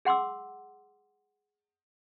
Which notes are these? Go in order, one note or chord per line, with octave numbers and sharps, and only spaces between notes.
G#4 F#5 C6 D6 E6